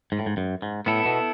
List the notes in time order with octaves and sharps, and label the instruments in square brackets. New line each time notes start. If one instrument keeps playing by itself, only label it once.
[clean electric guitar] G#2
A2
G#2
F#2
G#2
[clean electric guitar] A2 [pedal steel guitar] B3 E4 A4
[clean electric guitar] B2